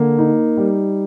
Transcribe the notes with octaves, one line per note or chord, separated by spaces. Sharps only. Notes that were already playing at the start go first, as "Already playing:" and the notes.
Already playing: D3 A#3
D#4
G3